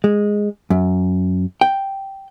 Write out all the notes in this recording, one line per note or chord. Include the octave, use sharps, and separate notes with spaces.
G#3
F#2
G5